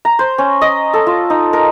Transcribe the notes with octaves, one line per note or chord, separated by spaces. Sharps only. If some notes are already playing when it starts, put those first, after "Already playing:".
A#5
C5
C#4
D#5
A4
F4
D#4
A#4